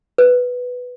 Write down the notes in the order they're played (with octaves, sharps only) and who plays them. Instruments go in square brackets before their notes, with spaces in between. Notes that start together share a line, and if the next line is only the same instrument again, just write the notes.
[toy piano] B4